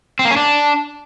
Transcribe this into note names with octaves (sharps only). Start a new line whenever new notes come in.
C4
A#3
C#4
D4